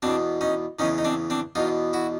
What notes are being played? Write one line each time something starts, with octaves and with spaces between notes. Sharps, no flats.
E2 B2 C4 D4
C#4 D#4
E2 C#3 E3 C#4 D#4
D#4
C4 D4
C4 D4
E2 B2 D#4 F4
E4 F#4